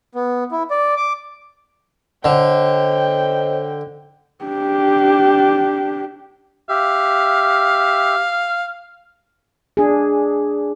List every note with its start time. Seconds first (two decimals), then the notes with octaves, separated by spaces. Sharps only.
0.15 B3
0.51 E4
0.70 D5
0.96 D6
2.25 D3 C5 C#5 D#5 G5
4.45 D4 G4
6.69 G4 E5 F5
9.77 D4 G#4